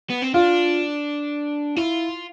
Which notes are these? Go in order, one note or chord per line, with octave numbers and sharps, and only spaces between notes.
B3
C4
D4 F4
E4 F4